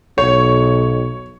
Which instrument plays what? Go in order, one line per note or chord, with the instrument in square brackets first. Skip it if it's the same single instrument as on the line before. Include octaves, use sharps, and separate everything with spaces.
[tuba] B1 [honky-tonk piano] C#5